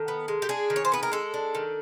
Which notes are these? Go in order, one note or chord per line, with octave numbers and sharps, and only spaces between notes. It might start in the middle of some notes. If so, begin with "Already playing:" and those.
Already playing: D#3 A4
B3
G#3
G4
D4 G#4
D#3
C#5
C5
B3 B4
A#4
G#3 A4
D4
D#3